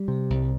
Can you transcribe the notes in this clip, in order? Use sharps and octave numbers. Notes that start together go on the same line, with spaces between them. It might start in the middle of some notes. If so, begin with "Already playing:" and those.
Already playing: G3
C3
C2